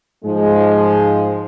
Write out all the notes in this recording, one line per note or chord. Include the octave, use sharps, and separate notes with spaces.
G#2 F3 G#3